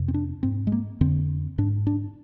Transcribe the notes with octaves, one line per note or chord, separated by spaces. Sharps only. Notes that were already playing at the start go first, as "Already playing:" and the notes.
Already playing: F2 C3
C4
D4
G#2 C4
G#3
A#3
F2 D3 C4
G#2 D4
D4